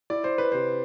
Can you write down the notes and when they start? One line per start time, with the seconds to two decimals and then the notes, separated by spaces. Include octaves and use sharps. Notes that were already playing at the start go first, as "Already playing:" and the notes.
0.10 E4 D5
0.24 C5
0.38 B4
0.52 C3 C5